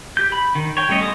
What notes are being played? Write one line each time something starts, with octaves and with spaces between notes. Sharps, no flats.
G4 G6
B5
D#3
C#5 G5
G3 A3 C#4 C#5 D#5
G#3 B3 A4 D#6